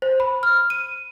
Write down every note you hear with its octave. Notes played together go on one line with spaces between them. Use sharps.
C5
B5
F6
D#7